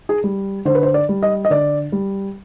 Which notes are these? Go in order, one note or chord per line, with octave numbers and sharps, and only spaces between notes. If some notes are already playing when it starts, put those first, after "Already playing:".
G#4
G3
D3 C5
B4
C5
D5
G3
D#5
D#5
D3 D5
G3